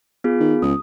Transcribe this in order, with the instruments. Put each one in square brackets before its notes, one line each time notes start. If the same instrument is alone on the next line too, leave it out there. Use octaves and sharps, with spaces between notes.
[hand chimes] B3 F4 G#4
[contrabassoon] D#3
[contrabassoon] C#2 [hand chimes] D#6